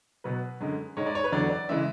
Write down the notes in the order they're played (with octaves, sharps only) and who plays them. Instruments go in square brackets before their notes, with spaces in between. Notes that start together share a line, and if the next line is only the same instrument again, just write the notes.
[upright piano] B2 F#3 B4
F#2 D3 G#3
G#2 G#3 C#5
D5
C#5
B4
E2 D3 F#3 D5
D5
C#3 E3 G#3 E5